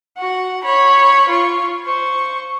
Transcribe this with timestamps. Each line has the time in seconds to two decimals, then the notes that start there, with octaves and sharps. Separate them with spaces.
0.17 F#4 F#5
0.63 C#5 B5
1.28 F4 C#6
1.85 C5 C#6